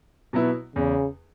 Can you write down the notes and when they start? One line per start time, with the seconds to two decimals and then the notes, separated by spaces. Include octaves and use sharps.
0.33 B2 F#3 B3 E4
0.76 E2 C#3